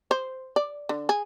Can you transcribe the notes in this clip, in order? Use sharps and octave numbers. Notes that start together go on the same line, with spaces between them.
C5
D5
D3
G#4